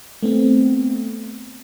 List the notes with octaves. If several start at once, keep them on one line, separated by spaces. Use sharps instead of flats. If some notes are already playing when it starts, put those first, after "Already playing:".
A3 B3 C4